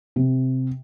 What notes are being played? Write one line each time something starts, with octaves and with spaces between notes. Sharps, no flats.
C3